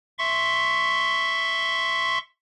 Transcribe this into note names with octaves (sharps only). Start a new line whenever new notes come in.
E5 C6 C#6